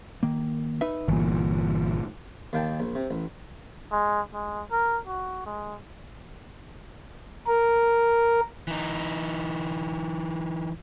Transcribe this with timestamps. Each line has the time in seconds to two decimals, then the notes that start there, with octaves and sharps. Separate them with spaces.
0.23 D#3 A#3
0.81 D#4 B4 E5
1.08 G1 A#2 E3
2.53 D#2 D#3 F5 G5 A5
2.80 A#1
2.95 C3
3.11 A1
3.92 G#3
4.34 G#3
4.72 A#4
5.07 F#4
5.46 G#3
7.47 A#4
8.67 E3 D#4